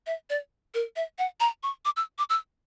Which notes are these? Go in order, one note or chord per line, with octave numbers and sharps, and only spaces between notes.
E5
D5
A#4
E5
F#5
A#5
C#6
D6
E6
D6
E6